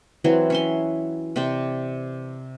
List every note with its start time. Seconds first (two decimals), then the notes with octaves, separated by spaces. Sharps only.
0.24 E3 F#3 C4
0.50 C#4 E5 C6
1.36 C3 C4 D5 G5